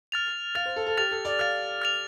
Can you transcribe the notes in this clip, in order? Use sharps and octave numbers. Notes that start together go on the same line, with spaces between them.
F6 A6 F7
F5 F6 A6 F7
C5
A4
A4
G4 F6 A6 F7
A4
D5
F5 F6 A6 F7
F6 A6 F7